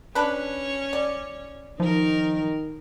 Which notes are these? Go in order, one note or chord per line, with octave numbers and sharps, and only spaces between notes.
C#4 D4 B4 C#5
D5
D#3 F3 D#4 A#4